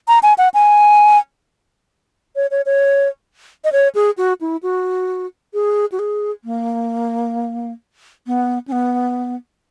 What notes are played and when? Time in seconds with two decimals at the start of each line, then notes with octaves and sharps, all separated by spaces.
0.08 A#5
0.23 G#5
0.38 F#5
0.54 G#5
2.36 C#5
2.51 C#5
2.66 C#5
3.64 D#5
3.72 C#5
3.95 G#4
4.17 F#4
4.41 E4
4.63 F#4
5.54 G#4
5.92 F#4
5.99 G#4
6.44 A#3
8.27 B3
8.68 C#4
8.72 B3